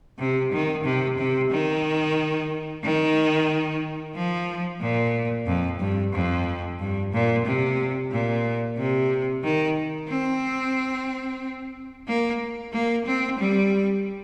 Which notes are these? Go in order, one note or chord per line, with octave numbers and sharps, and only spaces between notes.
C3
D#3
C3
C3
D#3
D#3
F3
A#2
F2
G2
F2
G2
A#2
C3
A#2
C3
D#3
C4
A#3
A#3
C4
G3